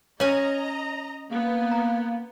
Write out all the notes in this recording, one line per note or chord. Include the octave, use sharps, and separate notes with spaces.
C#4 C#5 D#5 G#5 A#5
A#3 B3
A#5